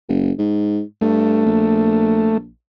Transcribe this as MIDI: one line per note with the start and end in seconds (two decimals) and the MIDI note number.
0.09 0.32 30
0.38 0.81 44
1.01 1.45 43
1.01 2.37 57
1.46 2.50 34